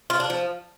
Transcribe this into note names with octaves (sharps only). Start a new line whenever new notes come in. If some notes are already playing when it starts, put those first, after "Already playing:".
F4
D4
F3